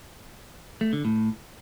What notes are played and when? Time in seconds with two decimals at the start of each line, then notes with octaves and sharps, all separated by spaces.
0.81 A3
0.93 D3
1.05 A2